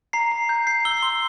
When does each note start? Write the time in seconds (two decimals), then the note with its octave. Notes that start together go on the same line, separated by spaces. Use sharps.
0.13 A#5 C7
0.32 A#5
0.49 G6
0.67 G6 C7
0.85 E6 G7
1.03 C6 G7